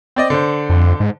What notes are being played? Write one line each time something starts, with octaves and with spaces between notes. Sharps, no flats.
C4 D5 D#5
D3 C5
F2
G#2